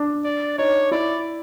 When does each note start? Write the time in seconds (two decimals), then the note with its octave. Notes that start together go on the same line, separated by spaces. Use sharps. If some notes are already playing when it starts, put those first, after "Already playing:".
Already playing: D4
0.24 D5
0.58 D#4 C#5
0.92 E4 D5